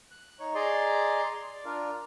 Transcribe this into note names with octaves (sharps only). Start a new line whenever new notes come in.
F#6
D#4 C#5
G#4 D5 D#5 A#5 C6
C6
D5
D4 F4 A#4